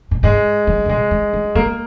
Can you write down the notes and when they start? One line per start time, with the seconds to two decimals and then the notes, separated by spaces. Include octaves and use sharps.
0.11 A#2
0.23 G#2 G#3
0.67 F#3
0.86 G#2
0.89 A#2 G#3
1.11 G#3
1.33 F#3
1.55 G#3 A#3